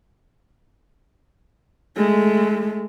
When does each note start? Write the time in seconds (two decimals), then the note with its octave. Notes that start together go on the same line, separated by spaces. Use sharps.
1.96 G#3 A3